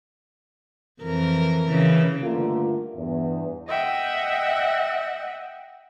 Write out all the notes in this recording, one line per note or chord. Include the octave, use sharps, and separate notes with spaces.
F2 E3 A#4
C#3 E3
G2 D3 A3 A#3 F4
E2 G2
D#5 E5 F#5 G5